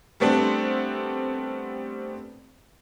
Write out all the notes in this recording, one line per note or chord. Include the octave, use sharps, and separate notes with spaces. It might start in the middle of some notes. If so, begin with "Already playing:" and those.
G3 A3 B3 C4 D4